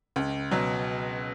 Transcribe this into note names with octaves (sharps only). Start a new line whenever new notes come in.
C#2
B2 F#3